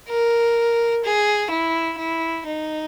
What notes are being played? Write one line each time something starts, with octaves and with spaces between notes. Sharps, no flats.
A#4
G#4
E4
E4
D#4